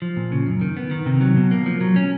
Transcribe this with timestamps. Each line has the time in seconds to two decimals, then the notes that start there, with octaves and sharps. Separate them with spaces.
0.02 F3
0.16 A#2
0.32 C#3
0.46 F#2
0.61 D#3
0.77 B3
0.91 D#3
1.06 C3
1.21 F#3
1.37 B2
1.51 A#3
1.66 F3
1.81 F#3
1.96 C#4